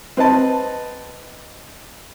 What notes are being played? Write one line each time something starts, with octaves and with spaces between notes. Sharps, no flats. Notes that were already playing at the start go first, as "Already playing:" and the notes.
C4 B4 D#5 A5